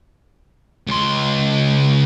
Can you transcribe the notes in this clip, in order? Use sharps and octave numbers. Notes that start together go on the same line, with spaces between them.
C#2 C6